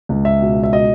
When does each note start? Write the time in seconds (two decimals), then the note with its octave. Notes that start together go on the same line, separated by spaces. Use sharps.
0.09 C#2
0.25 E5
0.41 B2
0.63 E5
0.72 B2 D#5